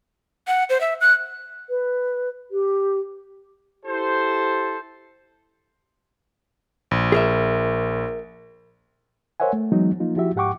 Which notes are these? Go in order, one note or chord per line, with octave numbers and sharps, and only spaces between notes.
F#5
C5
E5
F#6
B4
G4
E4 G4 A4 C5
A#1
G#4 A#4 E5
A#4 C5 C#5 E5 F#5 G#5
A3
E3 F#3 G#3 B3 D#4
F3 A#3 D#4 F4
F3 E4 F#4 G4 E5
G#2 G4 F#5 G5 C#6 D6